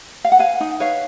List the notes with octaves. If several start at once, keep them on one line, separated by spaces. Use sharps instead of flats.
F5
F#5
B4 F5 G#5
D#4
B4 C#5 F5